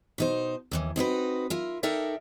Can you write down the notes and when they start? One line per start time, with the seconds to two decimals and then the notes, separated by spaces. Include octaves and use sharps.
0.18 B2 D#4 C5
0.71 D#2 A2 E3
0.96 C4 D#4 F#4 B4
1.50 F4 A#4 E5
1.83 D#4 A4 A#4 D5 E5 G5